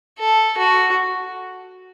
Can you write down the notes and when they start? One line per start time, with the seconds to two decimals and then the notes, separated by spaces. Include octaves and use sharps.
0.19 A4
0.58 F#4